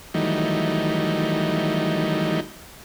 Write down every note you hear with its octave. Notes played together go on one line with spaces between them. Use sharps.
D#3 E3 F#3 G3 A3 D#4